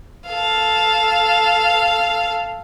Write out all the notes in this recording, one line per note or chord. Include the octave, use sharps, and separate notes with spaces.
A4 F5